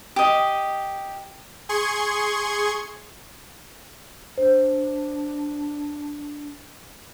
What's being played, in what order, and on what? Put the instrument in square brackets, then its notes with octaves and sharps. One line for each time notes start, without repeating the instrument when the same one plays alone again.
[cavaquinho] G4 D#5
[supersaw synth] G#4 C6 C#6 G#6
[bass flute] D4 [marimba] C5